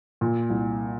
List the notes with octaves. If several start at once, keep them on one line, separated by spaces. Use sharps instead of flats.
A#2
C2